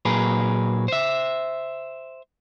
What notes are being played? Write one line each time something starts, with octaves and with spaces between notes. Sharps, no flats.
A#2 F#3 G#4 A#4 B4
C5 E5